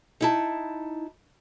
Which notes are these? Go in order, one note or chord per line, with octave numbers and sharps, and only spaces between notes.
D#4 E4 A5